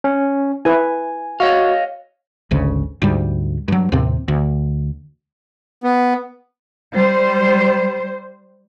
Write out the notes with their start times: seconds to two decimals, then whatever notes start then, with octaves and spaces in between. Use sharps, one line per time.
0.04 C#4
0.65 E4 B4 G#5
1.40 F#4 C#5 D#5 F5
2.51 G#1 D2 C#3
3.02 D2 G#2 G3
3.68 G2 F#3
3.92 D#2 A2 C3 C4
4.28 D2
5.83 B3
6.93 G3 C5